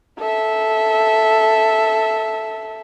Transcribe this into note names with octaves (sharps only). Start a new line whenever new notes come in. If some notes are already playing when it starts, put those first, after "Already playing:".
A4 E5